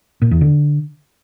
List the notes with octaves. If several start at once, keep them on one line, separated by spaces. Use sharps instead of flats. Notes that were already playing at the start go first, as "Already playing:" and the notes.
A#2
E2
D3